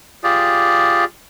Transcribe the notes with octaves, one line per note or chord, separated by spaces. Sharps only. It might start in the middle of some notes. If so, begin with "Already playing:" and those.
F4 G4 G#4 D5